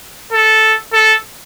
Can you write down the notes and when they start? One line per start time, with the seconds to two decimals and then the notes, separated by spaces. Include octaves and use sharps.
0.33 A4
0.93 A4